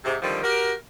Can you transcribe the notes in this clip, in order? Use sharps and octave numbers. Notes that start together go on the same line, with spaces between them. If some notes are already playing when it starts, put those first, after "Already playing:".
G#2 C3
D3 D#3 F3 G3 C4
F#4 G4 A#4